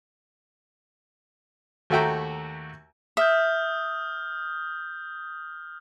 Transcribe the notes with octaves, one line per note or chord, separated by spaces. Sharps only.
D#2 A3 F#4 E5 G5 A#5
E5 D#6 F6 G6